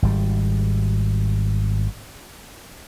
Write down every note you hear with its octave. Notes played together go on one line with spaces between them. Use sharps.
G#1 G3